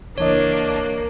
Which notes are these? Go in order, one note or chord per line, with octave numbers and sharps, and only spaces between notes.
C#2 E3 A#3 D4 C#5 D#5